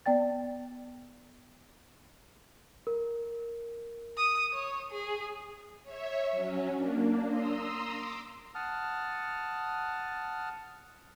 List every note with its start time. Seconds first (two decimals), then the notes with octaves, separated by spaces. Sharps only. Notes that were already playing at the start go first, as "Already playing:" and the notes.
0.06 B3 D5 G5 A6
2.87 A#4
4.17 D#6
4.52 C#5
4.91 G#4
5.83 C#5 E5
6.31 F#3 C#4
6.74 A#3 D4
7.27 A#5 C6 D#6 E6
7.91 D6
8.55 F#5 A5 D#6 F6